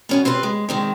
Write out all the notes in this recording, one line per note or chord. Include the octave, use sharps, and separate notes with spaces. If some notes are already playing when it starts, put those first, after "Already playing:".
B3 C#4 F#4
C4 F4 G4 B4
G#3
D#3 G#3 C4